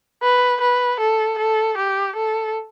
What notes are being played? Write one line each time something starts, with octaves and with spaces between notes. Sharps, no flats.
B4
B4
A4
A4
G4
A4